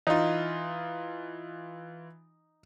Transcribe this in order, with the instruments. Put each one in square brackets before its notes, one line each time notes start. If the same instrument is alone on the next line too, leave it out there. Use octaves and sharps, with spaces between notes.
[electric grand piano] E3 F4 [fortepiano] D#4